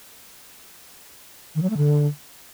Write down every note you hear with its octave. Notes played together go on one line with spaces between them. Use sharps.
D#3
F#3
A3
D3